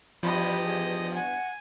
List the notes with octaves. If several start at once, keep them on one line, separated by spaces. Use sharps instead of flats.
E2 G2 F3 G4 D#5 B5
G#4
F#5 G#5